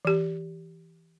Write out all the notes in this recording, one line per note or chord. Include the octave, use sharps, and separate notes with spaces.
E3 G4